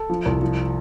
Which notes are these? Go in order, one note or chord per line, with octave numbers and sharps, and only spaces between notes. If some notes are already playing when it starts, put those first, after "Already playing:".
Already playing: A4
F3
C2
F3